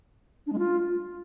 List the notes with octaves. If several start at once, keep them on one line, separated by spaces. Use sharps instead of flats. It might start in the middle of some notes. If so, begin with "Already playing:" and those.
D4
G#3
F4